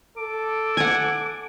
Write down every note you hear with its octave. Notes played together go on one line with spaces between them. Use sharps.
A4 D6
F#5 G#5